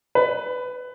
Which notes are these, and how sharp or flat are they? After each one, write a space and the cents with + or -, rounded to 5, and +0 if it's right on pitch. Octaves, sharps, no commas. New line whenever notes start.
B4 +20